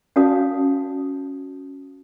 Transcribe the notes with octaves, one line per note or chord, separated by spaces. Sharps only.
C#4 F#4 D5 F5 A5 D#6